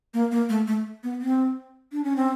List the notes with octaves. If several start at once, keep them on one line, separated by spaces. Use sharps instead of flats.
A#3
A#3
A3
A3
B3
C4
D4
C#4
C4